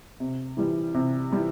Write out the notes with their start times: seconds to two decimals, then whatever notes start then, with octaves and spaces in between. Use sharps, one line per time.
0.20 C3
0.57 E3 G3
0.94 C3
1.32 E3 G3